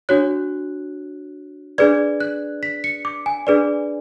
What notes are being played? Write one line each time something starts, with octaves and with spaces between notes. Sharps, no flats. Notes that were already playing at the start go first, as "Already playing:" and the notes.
D4 F#4 C#5 F#6
D4 G#4 B4 D5 G#6
F#6
B6
C#7
D6
G#5
D4 G#4 B4 D5